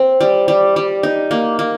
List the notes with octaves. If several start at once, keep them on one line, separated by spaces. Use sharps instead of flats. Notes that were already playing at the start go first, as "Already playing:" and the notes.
Already playing: C4
G3
G3
G3
D#4
A#3
A#3